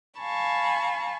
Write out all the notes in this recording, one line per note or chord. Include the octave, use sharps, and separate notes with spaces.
F5 G#5 A5 B5 C#6